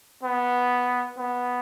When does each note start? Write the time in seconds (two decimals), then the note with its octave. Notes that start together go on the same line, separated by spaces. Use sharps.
0.23 B3
1.18 B3